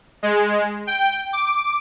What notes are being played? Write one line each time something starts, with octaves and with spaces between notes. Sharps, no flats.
G#3
G5
D6